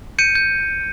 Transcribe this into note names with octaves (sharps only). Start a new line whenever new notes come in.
G6 C#7 D#7
G6